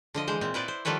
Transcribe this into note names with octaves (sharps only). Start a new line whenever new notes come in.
D3 F3 D#5
E3 G#3 C5
A#2 C4
E4 B4 C5 D5
C5
D#3 F3 G3 A4 B4 C#5